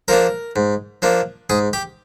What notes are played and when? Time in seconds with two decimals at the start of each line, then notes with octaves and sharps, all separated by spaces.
0.08 F3 A#3 D4 A#4
0.56 G#2
1.02 F3 A#3 D4
1.50 G#2 G#4
1.73 G4